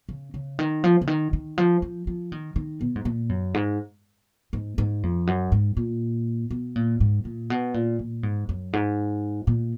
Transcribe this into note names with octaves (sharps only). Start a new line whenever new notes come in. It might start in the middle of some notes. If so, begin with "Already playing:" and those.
C#3
C#3
D#3
F3
C#3
D#3
D#3
F3
F3
F3
D#3
D#3
B2
G#2
A#2
F#2
G#2
G#2
G#2
F2
F#2
G#2
A#2
B2
A#2
G#2
A#2
B2
A#2
A#2
G#2
F#2
G#2
A#2